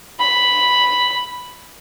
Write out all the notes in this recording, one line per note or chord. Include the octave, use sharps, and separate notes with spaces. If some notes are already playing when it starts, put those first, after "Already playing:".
B5